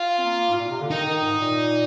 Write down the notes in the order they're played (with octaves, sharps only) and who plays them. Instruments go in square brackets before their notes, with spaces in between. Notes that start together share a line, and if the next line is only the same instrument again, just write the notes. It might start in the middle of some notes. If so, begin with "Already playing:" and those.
Already playing: [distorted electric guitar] F4
[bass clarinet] C4
A#3
G#2
A#2
C3
D3
[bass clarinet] D#3 [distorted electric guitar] D#4
[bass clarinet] D#3
G#2
A#2